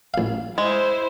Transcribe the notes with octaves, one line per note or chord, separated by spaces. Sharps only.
A1 F5
G#3 E4 C5